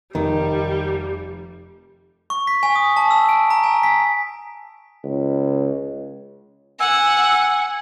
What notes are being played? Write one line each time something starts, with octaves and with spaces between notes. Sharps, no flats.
F1 D#3 G3
C#6
B6
G#5
D#6
A5
E6
D7
A#5
G#5
B6
C#2
F#5 G#5 E6